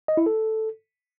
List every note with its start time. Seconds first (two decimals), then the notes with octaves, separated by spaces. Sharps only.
0.08 D#5
0.17 E4
0.26 A4